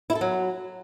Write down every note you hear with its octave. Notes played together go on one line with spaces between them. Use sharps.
E4
A4
F#3